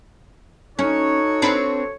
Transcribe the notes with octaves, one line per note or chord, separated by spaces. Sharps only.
C#4 D#4 F#4 A4 C#5
C4 D4 B4